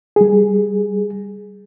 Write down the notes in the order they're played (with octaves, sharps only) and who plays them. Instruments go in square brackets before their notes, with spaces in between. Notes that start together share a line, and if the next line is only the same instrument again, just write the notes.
[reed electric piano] G3 G#4